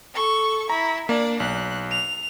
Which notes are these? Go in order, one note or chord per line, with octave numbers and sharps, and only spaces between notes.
A4 C#6
E4 A#5
A#3 D4 D5
B1 F#6
F7